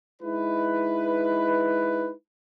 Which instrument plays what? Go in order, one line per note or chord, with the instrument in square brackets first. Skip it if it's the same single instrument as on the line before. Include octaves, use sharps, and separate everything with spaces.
[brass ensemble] G#3 D#4 E4 B4